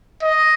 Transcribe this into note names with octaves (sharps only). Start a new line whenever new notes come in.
D#5